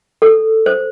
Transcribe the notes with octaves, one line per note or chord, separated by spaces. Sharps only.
A4
C5